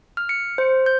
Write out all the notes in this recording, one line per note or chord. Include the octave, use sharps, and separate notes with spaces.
F6
C#7
C5
G6